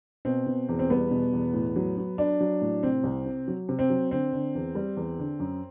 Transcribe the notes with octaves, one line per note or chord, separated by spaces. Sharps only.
B2 C4
B2
E2
C4
G3 B3
B2
E2
A2
F#3
F#3
F#3 D4
F#3
A2
C3 C4
C2
C3
F#3
C3
C4
F#3
D3 C4
D3
E2
G3
E2
D3
F#2